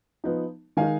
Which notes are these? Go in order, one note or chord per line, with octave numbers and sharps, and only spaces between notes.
F3 B3 D#4
D#3 G#3 D#4 F5 G#5